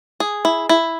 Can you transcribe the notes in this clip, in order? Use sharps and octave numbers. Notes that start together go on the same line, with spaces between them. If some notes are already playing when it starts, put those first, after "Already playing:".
G#4
E4
E4